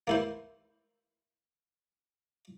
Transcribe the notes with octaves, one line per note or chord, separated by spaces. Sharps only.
A#3 E4 C5